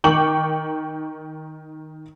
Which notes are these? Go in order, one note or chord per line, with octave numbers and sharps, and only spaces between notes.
D#3 G5 C#6 D6 F#7